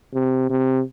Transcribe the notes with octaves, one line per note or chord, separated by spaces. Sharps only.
C3
C3